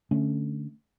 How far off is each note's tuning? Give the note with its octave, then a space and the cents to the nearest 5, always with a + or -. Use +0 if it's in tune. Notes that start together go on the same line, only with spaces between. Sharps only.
D3 +0 A3 +0 C#4 +0